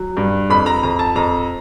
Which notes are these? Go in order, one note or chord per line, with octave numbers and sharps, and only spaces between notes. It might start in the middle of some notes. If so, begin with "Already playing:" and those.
Already playing: F#3
G2
F2 B5
A#5
F2 A#5
A5
F2 A#5